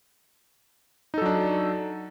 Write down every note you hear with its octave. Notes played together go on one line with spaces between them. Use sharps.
F#3 D4 D#4 A4